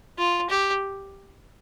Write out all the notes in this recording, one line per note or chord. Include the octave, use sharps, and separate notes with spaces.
F4
G4